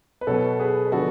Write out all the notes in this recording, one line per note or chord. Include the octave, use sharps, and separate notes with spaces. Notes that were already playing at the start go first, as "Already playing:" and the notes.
B4
B2 F#3 B3 A4 C#5
G#4 B4
B4
D3 F3 B3 F#4 A4